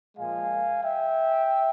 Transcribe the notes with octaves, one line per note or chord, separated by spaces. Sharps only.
A#2 F3 G#3 F5 G#5
E5 G5